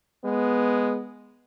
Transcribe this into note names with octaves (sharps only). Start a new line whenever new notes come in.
G#3 B3